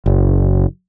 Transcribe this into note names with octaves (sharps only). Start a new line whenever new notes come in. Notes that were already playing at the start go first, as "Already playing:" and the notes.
F#1